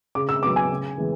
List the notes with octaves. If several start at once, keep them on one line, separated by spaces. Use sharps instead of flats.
C#3 D6
E6
F#3 B3 D6
G#5
C#3
E3 G#3 B3